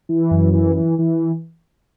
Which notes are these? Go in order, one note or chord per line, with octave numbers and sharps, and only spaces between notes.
E3
F#2
E3
E3
E3